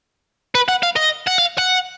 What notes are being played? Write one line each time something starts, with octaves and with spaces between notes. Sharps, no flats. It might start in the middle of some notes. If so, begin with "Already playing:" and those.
B4
F#5
F5
D#5
F#5
F5
F#5